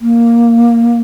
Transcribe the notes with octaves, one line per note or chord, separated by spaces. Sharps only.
A#3